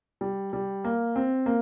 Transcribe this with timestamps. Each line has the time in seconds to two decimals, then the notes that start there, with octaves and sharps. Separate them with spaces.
0.21 G3
0.53 G3
0.84 A#3
1.16 C4
1.46 A#3